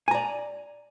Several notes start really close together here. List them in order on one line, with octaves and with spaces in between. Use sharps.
G#5 A#5 D5